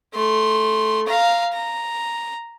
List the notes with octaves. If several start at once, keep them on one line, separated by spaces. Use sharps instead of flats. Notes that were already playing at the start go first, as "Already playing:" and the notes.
A3 C6
F5 A#5
A#5